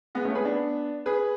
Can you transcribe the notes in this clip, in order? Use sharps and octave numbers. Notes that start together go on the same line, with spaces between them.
G#3 B3
A3 C#4
G#4 B4
B3 D4
G#4 B4